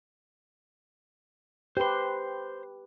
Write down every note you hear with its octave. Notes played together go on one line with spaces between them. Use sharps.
G4 B4 C5 C6